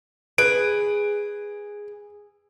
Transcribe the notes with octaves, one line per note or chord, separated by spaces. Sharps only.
G#4 B4 D7